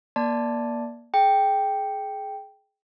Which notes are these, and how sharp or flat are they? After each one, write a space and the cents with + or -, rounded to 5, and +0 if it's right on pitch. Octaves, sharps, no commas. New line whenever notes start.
A#3 +30 D5 +0 A5 +0
G#4 +25 G5 +0